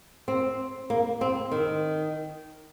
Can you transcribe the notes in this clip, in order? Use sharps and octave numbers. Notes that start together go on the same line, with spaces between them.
C4
A#3
C4
D#3